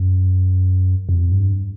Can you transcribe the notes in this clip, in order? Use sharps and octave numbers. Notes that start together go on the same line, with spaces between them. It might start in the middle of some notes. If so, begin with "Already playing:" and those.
Already playing: F#2
F2
G2